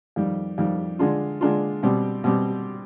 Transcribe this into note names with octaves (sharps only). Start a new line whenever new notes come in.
F2 D#3 G3
F2 D#3 G3
D3 G#3 D4 F4
D3 G#3 D4 F4
B2 G3 C4 G4
B2 G3 C4 G4